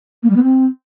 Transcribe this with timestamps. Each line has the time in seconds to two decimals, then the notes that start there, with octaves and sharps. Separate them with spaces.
0.23 A#3
0.30 G3
0.36 B3
0.43 C4